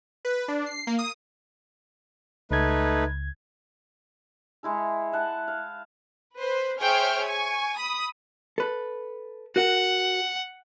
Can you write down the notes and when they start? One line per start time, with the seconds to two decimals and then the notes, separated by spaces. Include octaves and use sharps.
0.25 B4
0.48 D4
0.66 C7
0.87 A#3
0.99 D#6
2.51 C#2 A3 D#4 B4 G#6
4.63 G#3 E4 A4
5.12 E5 F#5 A5
5.48 F5
6.36 B4 C5
6.79 G#4 C5 C#5 E5 G5 F6
7.28 G#5 C#6
7.77 B5 D#6
8.58 A4 B4
9.56 F#4 A#4 F#5